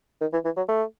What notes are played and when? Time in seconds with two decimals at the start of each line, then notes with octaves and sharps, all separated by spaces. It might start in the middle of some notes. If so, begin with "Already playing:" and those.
0.21 D#3
0.33 E3
0.45 E3
0.57 F#3
0.69 A3